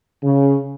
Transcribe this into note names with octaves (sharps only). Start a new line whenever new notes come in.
C#3